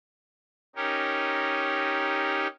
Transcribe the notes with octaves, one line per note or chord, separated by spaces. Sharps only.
C#4 D#4 G4 A#4